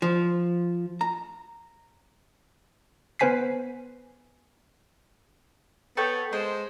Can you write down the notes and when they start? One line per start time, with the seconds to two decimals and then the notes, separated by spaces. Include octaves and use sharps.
0.02 F3
1.01 A#5
3.19 B3 B4 C5 G#5 B6 C7
5.97 B3 A4 C#5 G5
6.33 G#3 C5